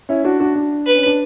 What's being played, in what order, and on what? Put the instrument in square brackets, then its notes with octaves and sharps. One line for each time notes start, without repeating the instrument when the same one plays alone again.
[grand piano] C#4 E4
D4 F#4
D4 F#4
D4
[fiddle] B4
[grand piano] C#4
D4